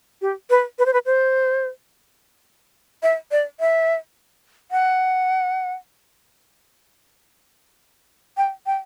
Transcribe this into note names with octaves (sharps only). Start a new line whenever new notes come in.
G4
B4
B4
C5
B4
C5
E5
D5
E5
F#5
G5
G5